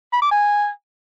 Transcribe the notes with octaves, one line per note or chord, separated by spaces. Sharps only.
B5
D6
G#5